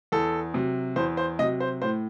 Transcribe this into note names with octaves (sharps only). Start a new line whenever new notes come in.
E2 A4
C3 F#3
E2 C5
C5
C3 F#3 D#5
C5
A2 C5